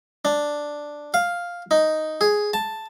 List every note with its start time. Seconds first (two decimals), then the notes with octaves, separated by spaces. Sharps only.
0.25 D4
1.14 F5
1.71 D#4
2.21 G#4
2.54 A5